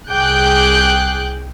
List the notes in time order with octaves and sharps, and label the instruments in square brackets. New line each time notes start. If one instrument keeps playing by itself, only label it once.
[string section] C2 G#4 G5 D6 F#6 G6